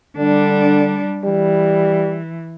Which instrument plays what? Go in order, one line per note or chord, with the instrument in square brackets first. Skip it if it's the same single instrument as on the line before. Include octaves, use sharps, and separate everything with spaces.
[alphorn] D3 [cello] G3 D4
[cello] E3 [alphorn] G3